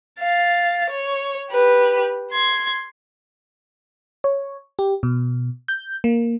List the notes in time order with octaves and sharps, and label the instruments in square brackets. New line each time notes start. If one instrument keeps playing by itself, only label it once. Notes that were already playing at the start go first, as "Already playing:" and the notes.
[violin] F5 A6
C#5
G4 B4
C6 G#6
[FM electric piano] C#5
G4
B2
G6
A#3